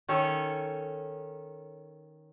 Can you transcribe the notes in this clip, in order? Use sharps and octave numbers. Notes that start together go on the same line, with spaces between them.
D#3 C#4 A4 C#5